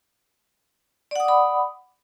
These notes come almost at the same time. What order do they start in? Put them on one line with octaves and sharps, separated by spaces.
D5 F#5 D#6 D6 B5